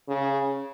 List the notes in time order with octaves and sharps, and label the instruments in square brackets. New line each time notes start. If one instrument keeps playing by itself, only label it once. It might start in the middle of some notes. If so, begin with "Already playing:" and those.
[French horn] C#3